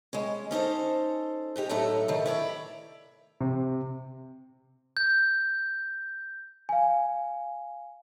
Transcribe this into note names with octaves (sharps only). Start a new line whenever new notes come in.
G#3 C#4
C#4 D#4 A4 C5
G#2 D#4 G4
A2 F#3 A3 D#4 A4 A#5
A2 D#3
E4 C#5 D5
C3
G6
F5 G#5